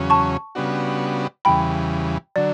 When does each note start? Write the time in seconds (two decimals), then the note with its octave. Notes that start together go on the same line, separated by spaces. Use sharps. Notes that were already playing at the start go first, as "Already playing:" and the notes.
Already playing: E2 C#3 F#3 C#4
0.10 A5 C#6
0.55 C#3 G3 B3 D4 F#4
1.45 E2 C#3 E3 G3 G5 B5
2.36 D3 F#3 D5